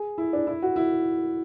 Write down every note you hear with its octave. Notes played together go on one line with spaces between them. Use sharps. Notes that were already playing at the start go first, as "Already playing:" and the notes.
Already playing: G#4
E4
D4
E4
F#4
E4